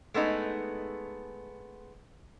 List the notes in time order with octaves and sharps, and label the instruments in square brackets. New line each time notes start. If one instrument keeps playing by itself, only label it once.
[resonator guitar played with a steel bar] G#3 A3 B3 D#4